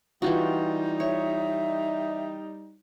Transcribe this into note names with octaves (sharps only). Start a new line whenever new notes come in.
E3 G3 D#4 F4 F#4 G5
C#5 E5